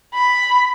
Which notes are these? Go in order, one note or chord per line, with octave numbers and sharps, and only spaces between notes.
B5